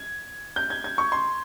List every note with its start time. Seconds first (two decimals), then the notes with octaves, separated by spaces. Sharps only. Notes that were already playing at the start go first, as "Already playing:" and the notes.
Already playing: G#6
0.56 G6
0.70 G#6
0.84 G#6
0.98 C#6
1.12 C6